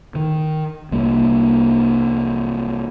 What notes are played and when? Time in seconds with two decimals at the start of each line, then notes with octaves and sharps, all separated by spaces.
0.15 D#3
0.91 C2 G3 A#3